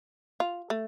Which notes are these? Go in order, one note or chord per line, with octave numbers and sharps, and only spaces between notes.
F4
A3